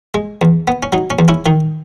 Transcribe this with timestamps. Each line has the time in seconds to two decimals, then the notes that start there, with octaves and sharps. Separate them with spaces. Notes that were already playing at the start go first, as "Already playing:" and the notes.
0.14 G#3
0.42 E2
0.68 B3
0.83 C#4
0.93 F#3 D#4
1.10 C#4
1.19 E2
1.28 C#4 E4
1.46 D#3 D#4